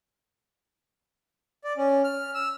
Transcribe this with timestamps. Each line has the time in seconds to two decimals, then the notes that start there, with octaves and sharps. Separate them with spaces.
1.64 D5
1.77 C#4
2.04 F6
2.35 E6